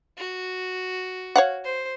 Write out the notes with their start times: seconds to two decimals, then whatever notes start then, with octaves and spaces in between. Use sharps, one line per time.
0.17 F#4
1.36 C#5 F5 F#5
1.64 C5